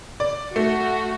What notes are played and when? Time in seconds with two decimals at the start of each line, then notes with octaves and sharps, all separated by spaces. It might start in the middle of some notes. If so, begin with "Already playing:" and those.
0.20 D5
0.56 A3 F#4